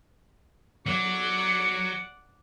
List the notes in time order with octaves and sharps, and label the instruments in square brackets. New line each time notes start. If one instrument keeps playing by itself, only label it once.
[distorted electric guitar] F#3 [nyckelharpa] D5 F#5 [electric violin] C#7